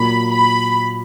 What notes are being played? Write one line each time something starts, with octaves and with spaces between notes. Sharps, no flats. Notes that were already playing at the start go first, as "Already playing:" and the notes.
Already playing: A#2 F#3 A#3 B5
B5